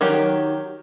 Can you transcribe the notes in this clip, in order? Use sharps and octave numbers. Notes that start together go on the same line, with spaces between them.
D#3 F#3 G4